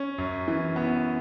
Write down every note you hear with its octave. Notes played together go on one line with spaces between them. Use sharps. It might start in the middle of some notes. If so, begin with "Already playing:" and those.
Already playing: C#4
F#2
E3
B3